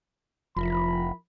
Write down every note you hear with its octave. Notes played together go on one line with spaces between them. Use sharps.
F1 F3 E4 A#4 B5